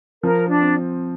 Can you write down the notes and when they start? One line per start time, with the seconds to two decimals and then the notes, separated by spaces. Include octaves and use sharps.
0.22 F3 A#4
0.48 D4
0.61 C4